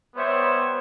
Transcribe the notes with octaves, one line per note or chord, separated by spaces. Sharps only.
G3 B3 C5 C#5 E5